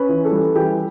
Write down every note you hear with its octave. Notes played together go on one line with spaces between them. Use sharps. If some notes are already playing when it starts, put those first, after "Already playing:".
Already playing: C#4 B4
E3
A4
G3
E3 G4